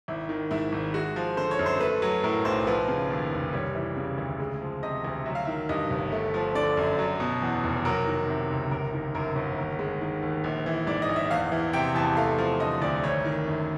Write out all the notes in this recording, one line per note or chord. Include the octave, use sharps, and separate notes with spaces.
G#1 E4
D#3
G#2 E4
G#1
G#3 F#4
F3
D3 C5
C#5
F#2
C5
A3 B4
F#3
A2 A#4
B1 C5
F3 B4
C#3
D#2
F1
G3 C#5
E3
C#3
D2
G#3
F3
C3 D#5
D2
F#3 E5
F5
D#3 E5
G2 D#5
G1
A3
F3
D3 D5
F#2
F#3
B2
E2
F1
F#3 A#4
D#3
C3
C#2
G1 A#4
D#3
F#2 A#4
G1
D#2 A#4
G#3
D#3
D#2
A#1
E3
G#2 D5
D#5
A#1
E5
E2 F5
E3
C3 G5
E2 A5
A3 F5
F3
D3 D#5
D2 D5
G#1 C#5
D#3
F#2